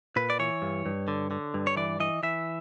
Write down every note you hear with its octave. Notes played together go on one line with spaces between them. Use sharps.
A#2 B4
D5
E3 C#5
G2
G2
D3
D3
G2
C#5
E3 D5
E3 D#5
E3 E5